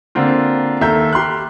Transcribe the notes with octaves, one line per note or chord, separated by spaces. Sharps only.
D3 A#3 C4 F4
D#2 A4 E5 A#5 G6
G4 C6 F6 F#6